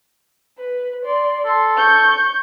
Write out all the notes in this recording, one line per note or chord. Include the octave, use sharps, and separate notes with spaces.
B4
D5 C6
A4 C6
C#6 G6